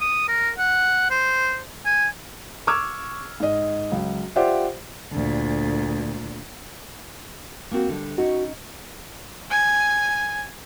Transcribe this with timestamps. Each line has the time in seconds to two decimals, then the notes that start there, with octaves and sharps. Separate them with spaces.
0.01 D#6
0.28 A#4
0.58 F#5
1.10 C5
1.86 G#5
2.67 C#6 D6 E6 F6 G#6
3.40 G#2 D#5
3.92 C#2 F#3
4.36 F4 G4 C5 D5 E5 F#5
5.13 D2 A#2
7.71 A#3 C4 F#4
7.89 D3 G3
8.18 C#4 D#4 F#4
9.51 G#5